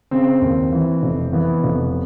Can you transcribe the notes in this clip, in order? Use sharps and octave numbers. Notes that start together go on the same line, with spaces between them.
C#3 C4
D#2
E3
F1
E3 B3
F1